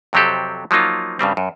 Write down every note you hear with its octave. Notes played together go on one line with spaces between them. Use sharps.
F2 C3 F#3 C4 G4 A4
F3 F#3 A#3 D#4 F4
G2 C#3 G3 C4
F#2